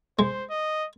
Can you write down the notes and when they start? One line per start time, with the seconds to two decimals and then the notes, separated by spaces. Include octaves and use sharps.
0.19 G#3 C5
0.50 D#5